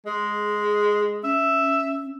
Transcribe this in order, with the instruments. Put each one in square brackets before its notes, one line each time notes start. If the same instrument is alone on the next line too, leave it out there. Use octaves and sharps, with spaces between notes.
[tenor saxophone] G#3 [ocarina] G#4
[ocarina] C#4 [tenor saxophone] E5